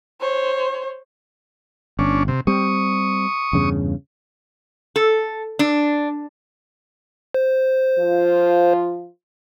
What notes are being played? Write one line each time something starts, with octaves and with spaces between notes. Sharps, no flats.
C5 C#5
G1 C#4 D4
C3
G3 C4 C#6 D#6
E2 G2 C#3
A4
D4
C5
F3 F4